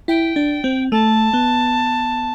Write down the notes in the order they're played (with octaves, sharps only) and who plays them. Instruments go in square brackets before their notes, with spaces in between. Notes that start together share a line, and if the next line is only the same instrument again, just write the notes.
[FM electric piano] E4 [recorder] G5
[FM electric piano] D4
C4
[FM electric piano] A3 [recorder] A5
[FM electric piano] B3